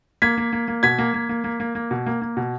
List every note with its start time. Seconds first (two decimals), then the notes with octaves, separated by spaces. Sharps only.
0.22 A#3 G#6 B6
0.38 A#3
0.53 A#3
0.68 A#3
0.83 B2 G#6 B6
0.98 A#3
1.14 A#3
1.29 A#3
1.44 A#3
1.60 A#3
1.75 A#3
1.91 B2
2.06 A#3
2.22 A#3
2.37 B2